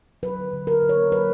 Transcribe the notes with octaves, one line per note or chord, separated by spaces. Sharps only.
F#3 B4
D3
D3
F#3 A#4
D3
C#5
A#3
F#3 B4